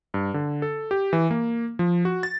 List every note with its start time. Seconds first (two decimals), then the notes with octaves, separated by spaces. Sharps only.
0.14 G2
0.34 D3
0.62 A4
0.91 G4
1.13 E3
1.31 A#3
1.79 F3
2.05 F#4
2.23 A6